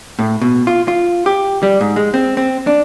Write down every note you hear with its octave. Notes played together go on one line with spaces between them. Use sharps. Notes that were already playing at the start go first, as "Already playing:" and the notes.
A2
B2
F4
F4
G4
G3
G#2
G#3
C4
C4
D4